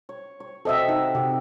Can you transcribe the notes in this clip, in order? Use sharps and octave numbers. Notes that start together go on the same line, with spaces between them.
C#5
C#5
C3 F#4 A4 D#5 E5
D#4 F#5
C3 G4